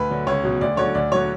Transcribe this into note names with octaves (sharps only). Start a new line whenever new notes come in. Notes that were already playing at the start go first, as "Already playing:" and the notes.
Already playing: D2 B4
D3 F#3
C#2 C#5
B2 F#3
D2 D5
D3 F#3 C#5
D2 D5
D3 F#3 C#5